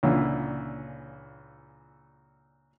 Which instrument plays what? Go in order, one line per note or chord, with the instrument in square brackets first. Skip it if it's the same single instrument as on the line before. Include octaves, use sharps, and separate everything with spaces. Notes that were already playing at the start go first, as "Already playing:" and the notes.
[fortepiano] C#2 A#2 D3 E3